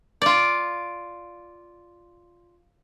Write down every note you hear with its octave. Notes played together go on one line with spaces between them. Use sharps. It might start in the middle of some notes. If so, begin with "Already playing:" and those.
F4 D5